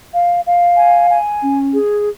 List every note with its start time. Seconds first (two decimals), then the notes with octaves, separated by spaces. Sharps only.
0.12 F5
0.44 F5
0.76 G#5
1.09 G#5
1.40 C#4
1.72 G#4